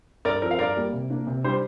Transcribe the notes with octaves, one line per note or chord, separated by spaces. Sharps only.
G2 A#4 D5
F3 C4 A#4
F5
G2 A#4 D5
G3 A#3
C3
A#3 D4
C3
G3 D4 C5